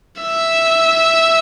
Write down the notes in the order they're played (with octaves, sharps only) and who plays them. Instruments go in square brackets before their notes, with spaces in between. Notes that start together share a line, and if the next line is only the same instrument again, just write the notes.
[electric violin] E5